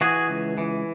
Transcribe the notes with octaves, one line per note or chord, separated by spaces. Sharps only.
E3 F#4 G#4
C#2
E3